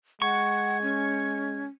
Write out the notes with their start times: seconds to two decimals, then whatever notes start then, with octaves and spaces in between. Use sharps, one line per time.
0.22 G#3 F#5 C#6 G#6
0.82 C#4